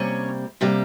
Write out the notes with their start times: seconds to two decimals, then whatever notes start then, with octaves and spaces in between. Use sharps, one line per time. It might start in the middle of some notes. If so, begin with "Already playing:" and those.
Already playing: C3 G3 A#3 C#4 C#5
0.61 C3 G3 A#3